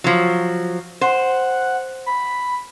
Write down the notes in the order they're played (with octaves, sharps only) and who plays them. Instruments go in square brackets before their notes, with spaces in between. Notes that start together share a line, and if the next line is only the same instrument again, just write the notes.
[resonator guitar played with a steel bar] F3 F#3
[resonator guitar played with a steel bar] C5 [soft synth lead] F#5
[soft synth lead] B5